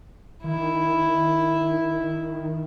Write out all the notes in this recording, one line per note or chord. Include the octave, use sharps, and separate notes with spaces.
D#3 E4